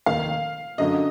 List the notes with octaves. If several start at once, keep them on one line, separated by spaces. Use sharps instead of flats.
F1 D#2 D#3 F5
F#2 D3 F#3 D#5